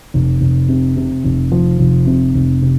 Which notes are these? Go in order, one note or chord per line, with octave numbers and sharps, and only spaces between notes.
F1
F1
C3
C3
F1
F3
F1
C3
F1
C3